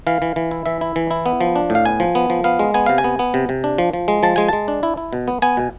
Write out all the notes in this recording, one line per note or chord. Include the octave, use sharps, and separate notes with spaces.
E3 F5
E3
E3
E4
E3 E5
E4
E3
E4
B3
F3
D4
A2
F5
B3 G#5
F3
B3
F3
B3 F5
G#3
B3 G#5
C3 F5
G#5
B3
B3
C3
C3
D4
F3
F3
G#3
F3 A5
G#3 G#5
G#3 A5
D4
E4
E4
B2
B3
B3 G#5
B2